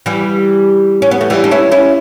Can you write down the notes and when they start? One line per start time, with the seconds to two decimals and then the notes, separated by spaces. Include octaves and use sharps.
0.06 E3 G3
1.02 C#4
1.11 B3
1.21 A3
1.30 E3 G3
1.44 D4
1.51 C#4 E4
1.72 C#4 E4